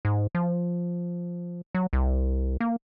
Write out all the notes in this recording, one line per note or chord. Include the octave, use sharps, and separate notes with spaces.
G#2
F3
F#3
C2
A#3